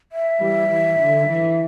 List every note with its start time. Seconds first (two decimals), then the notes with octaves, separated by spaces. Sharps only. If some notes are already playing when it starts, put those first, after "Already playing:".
0.12 E5
0.41 E3 G3
0.70 E3
0.99 D3
1.28 E3